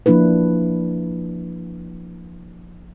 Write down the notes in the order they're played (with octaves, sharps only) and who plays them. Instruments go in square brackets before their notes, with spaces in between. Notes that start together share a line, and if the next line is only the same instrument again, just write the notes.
[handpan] F3 A#3 D4 E4 B4